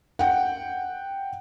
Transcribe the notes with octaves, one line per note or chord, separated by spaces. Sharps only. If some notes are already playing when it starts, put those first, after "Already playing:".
F#5 G5